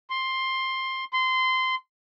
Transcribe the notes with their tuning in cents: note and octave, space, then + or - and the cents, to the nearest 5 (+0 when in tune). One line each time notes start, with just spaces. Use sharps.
C6 +10
C6 -20